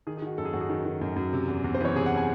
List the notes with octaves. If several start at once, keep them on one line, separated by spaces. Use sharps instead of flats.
D#3 G#4
G#4
D#3 F#4
F#2 A4
G#4
F#2 F#4
G#4
D#3
D#3
F#2
F#2
C3
E2
E2
C5
E3 C#5
C3 G#4
F#5
G#5